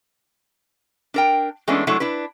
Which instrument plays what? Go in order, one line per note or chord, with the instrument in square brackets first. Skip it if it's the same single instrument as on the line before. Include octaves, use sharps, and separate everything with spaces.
[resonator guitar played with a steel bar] D4 A#4 G5
E3 G#3 A3 B3 C#4 D4
F#3 G#3 A3 D4 E4
D4 E4 B4